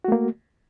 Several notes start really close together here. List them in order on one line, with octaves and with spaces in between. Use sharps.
F#4 A3 A#3